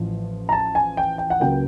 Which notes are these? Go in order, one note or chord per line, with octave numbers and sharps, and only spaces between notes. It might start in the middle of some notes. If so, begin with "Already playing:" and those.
Already playing: A1 A2 F3
A#5
A5
G#5
G5
G5
F#5
C#2 C#3 F#3 A#3 G5